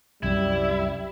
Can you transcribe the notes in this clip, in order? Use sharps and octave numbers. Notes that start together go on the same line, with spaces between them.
C2 F#2 C3 G3 E4